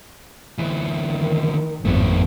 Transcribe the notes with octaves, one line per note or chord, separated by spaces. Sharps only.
D2 E3
D#3
G#1 F2 A2 A3 B3